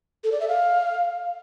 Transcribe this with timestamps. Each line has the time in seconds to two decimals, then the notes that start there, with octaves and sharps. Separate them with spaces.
0.24 A4
0.32 D5
0.40 E5
0.48 F5